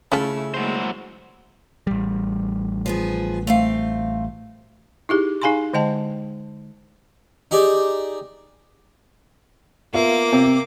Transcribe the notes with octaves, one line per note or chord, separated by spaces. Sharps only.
C#3 A3 C#4 E4 F4 A4
F#3 G#3 A#3 E4 C5
A1 G3
F3 B3 G#4
A3 C4 F5
D#4 E4 G4 G#4
D#4 G#4 F5 G#5 B5 C6
D3 G#3 D#5 G5 A5
D#4 G4 G#4 D5
A#3 B3 F4 E5 D6
C3